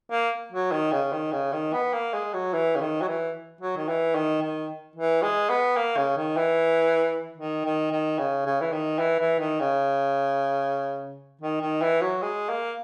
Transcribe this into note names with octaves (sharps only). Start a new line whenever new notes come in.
A#3
F#3
D#3
C#3
D#3
C#3
D#3
B3
A#3
G#3
F#3
E3
C#3
D#3
F#3
E3
F#3
D#3
E3
D#3
D#3
E3
G#3
B3
A#3
C#3
D#3
E3
D#3
D#3
D#3
C#3
C#3
E3
D#3
E3
E3
D#3
C#3
D#3
D#3
E3
F#3
G#3
A#3